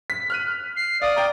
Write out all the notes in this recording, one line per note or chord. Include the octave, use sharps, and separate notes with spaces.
B6
F6 F#6 D#7
C7
D5 F5 D#6
G5 A#5